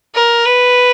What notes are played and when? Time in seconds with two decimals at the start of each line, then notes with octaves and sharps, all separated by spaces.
0.15 A#4
0.45 B4